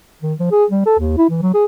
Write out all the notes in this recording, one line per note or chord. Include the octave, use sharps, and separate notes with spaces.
D#3
F3
G#4
G3
A4
D#2
E4
E3
F#3
G#4